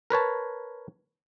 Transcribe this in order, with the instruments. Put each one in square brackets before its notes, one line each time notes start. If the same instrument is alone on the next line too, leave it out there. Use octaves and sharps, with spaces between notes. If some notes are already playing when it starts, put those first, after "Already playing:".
[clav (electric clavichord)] A#4 B4 C#5 A5